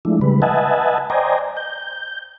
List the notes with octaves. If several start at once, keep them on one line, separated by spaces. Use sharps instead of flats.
F3 G#3 A3 D4 E4
C#3 G3 G#3 B4
B4 D#5 E5 F#5 G#5 A5
C5 D5 D#5 G5 G#5 A#5
G6